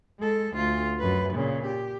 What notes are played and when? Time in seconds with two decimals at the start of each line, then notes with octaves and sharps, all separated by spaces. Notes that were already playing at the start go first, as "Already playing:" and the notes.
0.20 G#3 A4
0.54 D2 F4
1.00 F#2 B4
1.33 A#2 C#3
1.66 G4